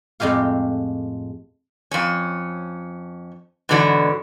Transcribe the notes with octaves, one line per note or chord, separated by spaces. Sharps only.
F2 A2 G#3 G4 F5
F2 C#4
G#2 B2 D3 E3 F#3